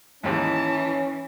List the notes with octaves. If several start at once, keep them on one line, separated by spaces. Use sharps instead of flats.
D#2 G#2 E3 C#4 A5